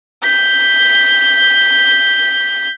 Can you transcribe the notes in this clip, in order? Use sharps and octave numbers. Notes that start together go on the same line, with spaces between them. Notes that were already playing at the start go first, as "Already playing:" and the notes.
G6 B6